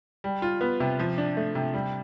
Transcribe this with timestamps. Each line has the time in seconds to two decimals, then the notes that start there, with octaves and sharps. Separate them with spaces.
0.24 G3
0.42 F4
0.61 B3
0.80 C3
0.99 F3
1.18 D4
1.37 A3
1.55 C3
1.74 G3